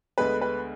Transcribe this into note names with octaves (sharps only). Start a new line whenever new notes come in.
D2 D3 G#3 B3 B4
B4